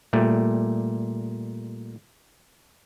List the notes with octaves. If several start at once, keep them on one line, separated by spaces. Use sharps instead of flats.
A#2 G3 A3